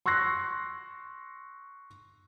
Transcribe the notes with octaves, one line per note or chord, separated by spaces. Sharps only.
C6 C#6 E6 F#6 A#6 C7